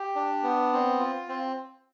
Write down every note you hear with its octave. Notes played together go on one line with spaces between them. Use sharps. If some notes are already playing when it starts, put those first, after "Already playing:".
Already playing: G4
D4
B3
C4
F4
C4